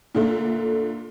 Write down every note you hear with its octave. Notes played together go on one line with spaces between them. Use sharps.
A#2 D3 A3